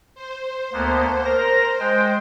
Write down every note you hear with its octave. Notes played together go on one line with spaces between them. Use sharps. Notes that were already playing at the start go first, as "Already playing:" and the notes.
C5
D2 A#3 B3
A#4 A#6
G#3 G5